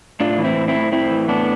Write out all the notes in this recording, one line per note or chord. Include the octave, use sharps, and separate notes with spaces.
A2 D4 F4
E3
C4 E4
A2
C4 E4
A2
A2 C4 E4
E3
A2 B3 D4